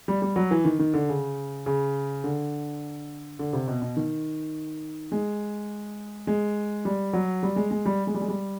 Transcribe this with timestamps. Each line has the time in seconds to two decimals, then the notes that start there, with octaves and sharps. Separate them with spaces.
0.08 G3
0.22 G3
0.36 F#3
0.51 E3
0.65 D#3
0.79 D#3
0.94 D3
1.09 C#3
1.66 C#3
2.24 D3
3.39 D3
3.53 C3
3.68 B2
3.82 B2
3.97 D#3
5.12 G#3
6.27 G#3
6.85 G3
7.13 F#3
7.43 G3
7.56 G#3
7.71 G#3
7.85 G3
8.07 G#3
8.14 G3
8.21 G#3
8.28 G3